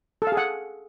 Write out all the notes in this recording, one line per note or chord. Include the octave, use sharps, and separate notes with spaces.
A4
F5
G#4
F#5